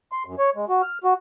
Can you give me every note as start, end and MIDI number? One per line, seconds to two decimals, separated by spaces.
0.12 0.23 84
0.26 0.35 42
0.39 0.50 73
0.56 0.65 56
0.69 0.82 66
0.82 0.98 89
1.04 1.14 66